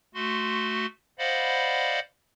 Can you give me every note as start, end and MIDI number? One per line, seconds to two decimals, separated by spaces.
0.14 0.86 57
0.14 0.86 66
0.14 0.86 84
1.19 2.00 72
1.19 2.00 74
1.19 2.00 75
1.19 2.00 77
1.19 2.00 78
1.19 2.00 83